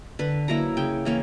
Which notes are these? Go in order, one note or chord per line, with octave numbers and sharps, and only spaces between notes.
D3 B4
F#3 A#3 E4 A#5
C#3 G5
E3 A#3 C#4